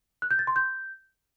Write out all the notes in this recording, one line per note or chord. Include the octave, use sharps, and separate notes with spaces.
F#6
G6
A6
C6
G6